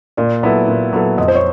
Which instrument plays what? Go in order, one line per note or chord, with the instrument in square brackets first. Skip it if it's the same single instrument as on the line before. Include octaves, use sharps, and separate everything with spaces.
[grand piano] A#2 [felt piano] D5
[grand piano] F#3 B3 E4 A4
A#2
F#3 B3 E4 A4
[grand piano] F2 [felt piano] D#5
[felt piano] C5
C#5